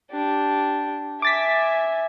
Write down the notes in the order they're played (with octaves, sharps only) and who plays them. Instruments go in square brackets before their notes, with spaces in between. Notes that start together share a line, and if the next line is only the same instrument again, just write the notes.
[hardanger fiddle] D4 G4
[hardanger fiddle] E5 G#5 [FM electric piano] D6 A6 B6